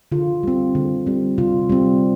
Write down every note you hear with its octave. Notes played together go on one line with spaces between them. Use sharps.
D3 F4
G3 C4
D3
G3 C4
C3 F4
G3 C4